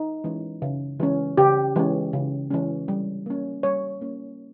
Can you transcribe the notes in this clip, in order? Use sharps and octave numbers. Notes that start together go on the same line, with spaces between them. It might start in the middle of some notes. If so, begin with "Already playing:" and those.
Already playing: D#4
E3 G#3 C#4
C#3
E3 G#3 C#4
C#3 G4
E3 G#3 C#4
C#3
E3 G#3 C#4
G3
A#3 C#4
G3 C#5
A#3 C#4